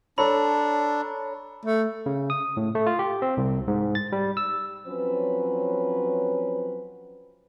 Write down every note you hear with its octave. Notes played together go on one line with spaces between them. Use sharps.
D4 A4 C#5 A#5 B5
A3
C#3
D#6
A2
A3
F4
G4
C4
C2
G#2
A6
G3
E6
F3 F#3 C4 C#4 B4